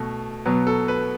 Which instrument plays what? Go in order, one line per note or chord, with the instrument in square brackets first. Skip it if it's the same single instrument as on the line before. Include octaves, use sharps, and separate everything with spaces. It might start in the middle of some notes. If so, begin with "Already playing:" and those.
Already playing: [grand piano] B2 A3
B2 F#3 B3
A4
B4